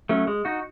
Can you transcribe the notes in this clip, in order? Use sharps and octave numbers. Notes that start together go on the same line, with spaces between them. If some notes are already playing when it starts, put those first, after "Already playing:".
F#3 A3 C#4
G#3
D#4 F#4